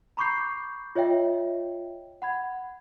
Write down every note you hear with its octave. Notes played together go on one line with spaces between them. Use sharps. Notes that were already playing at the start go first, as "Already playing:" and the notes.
A#5 B5 C#6 D6 G6 C7
F4 C#5 D#5 E5 G5
F#5 B5 G#6